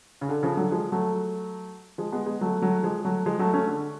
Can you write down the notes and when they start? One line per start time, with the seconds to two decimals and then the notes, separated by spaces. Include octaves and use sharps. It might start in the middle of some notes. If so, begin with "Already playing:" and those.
0.21 C#3
0.29 D3
0.43 C#3 F3
0.57 D3 F#3
0.71 F3 G#3
0.92 F#3 A3
1.98 F3 G#3
2.12 G#3 B3
2.26 G#3 B3
2.41 F#3 A3
2.62 F#3 A3
2.83 F3 G#3
3.05 F#3 A3
3.26 F3 G#3
3.39 F#3 A3
3.53 A3 C#4
3.68 D3